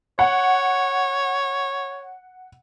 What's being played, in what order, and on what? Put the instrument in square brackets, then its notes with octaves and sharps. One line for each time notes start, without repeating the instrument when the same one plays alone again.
[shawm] C#5 [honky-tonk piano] F#5